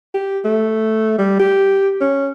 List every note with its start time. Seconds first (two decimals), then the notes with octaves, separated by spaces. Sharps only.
0.15 G4
0.45 A3
1.18 G3
1.39 G4
2.01 C#4